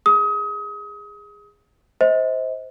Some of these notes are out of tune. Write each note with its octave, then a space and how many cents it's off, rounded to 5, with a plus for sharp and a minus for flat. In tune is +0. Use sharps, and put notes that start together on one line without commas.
G#4 -15 D#6 +30
C5 -5 D#5 +40